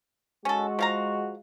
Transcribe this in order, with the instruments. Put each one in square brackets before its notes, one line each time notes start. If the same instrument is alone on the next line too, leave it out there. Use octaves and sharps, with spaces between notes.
[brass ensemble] G#3 F#4 [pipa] C#4 A4
[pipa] F3 F5 A#5